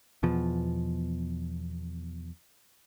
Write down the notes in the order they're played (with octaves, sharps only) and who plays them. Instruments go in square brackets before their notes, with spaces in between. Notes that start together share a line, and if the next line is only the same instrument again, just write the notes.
[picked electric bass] E2 B2 F3